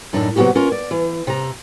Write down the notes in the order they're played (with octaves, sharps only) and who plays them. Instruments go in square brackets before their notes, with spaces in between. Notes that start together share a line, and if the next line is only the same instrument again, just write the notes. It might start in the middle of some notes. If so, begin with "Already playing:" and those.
[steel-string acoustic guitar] F#2 A2 D4 D#4
C3 F#3 B3 D4 F#4 G4
C#4 F4 A#4
D5
E3
C3 A#5